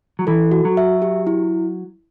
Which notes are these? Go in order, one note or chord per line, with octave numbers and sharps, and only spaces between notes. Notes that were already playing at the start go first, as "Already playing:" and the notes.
F#3
E3 A4
F#4
F#3
E5
G4
E4